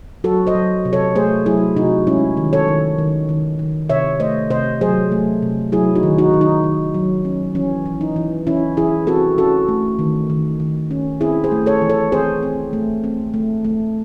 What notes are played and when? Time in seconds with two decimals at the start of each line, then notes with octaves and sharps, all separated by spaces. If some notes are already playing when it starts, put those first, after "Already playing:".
0.24 F#3 F#4 A4
0.47 C5 D#5
0.55 F#3
0.85 C3
0.93 A4 C#5
1.15 A3 G#4 C5
1.46 F#3 E4 G#4
1.76 C3 D#4 F#4
2.07 G#3 C#4 E4
2.37 D#3
2.53 A4 C#5
2.68 D#3
2.98 D#3
3.29 D#3
3.59 D#3
3.90 C3 C#5 E5
4.20 A3 C5 D#5
4.50 C3 C5 D#5
4.81 F#3 G#4 C5
5.12 A3
5.42 C3
5.72 F#3 E4 G#4
5.95 D#4 F#4
6.03 D#3
6.18 D#4 F#4
6.33 D#3
6.41 D#4
6.64 D#3
6.94 F#3
7.25 C#4
7.55 E3 C#4
7.86 E3
8.01 D#4
8.16 E3
8.47 E3 C#4 E4
8.77 E3 E4 G#4
9.07 C4 F#4 A4
9.38 C#4 F#4 A4
9.69 A3
9.99 D#3
10.30 D#3
10.60 D#3
10.91 C#4
11.20 C4 E4 G#4
11.44 G#4 C5
11.52 A3
11.66 A4 C#5
11.82 E3
11.89 A4 C#5
12.12 C4 G#4 C5
12.43 C4
12.73 A3
13.04 C4
13.34 A3
13.64 A3